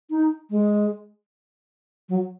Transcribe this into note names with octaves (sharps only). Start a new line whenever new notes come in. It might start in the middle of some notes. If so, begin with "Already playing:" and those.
D#4
G#3
F#3